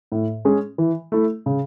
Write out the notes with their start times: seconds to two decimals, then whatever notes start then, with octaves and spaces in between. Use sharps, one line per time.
0.12 A2
0.45 G#3 C#4 G#4
0.78 E3
1.12 A3 E4
1.46 C#3